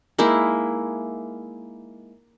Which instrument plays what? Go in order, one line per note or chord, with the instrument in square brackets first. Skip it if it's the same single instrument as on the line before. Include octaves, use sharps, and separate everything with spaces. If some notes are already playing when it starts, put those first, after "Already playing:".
[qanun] G#3 A#3 D#4 E4